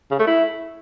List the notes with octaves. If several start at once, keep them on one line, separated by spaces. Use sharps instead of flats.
C#3
A3
E4